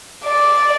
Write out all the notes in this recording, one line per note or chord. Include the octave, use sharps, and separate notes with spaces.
D5